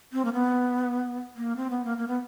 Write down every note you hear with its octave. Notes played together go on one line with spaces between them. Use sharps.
C4
A#3
B3
A#3
C4
B3
A#3
A#3
B3